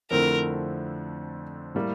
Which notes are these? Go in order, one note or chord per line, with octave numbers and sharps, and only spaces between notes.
F2 D3 A3 C4 E4 A#4
A2 G3 A#3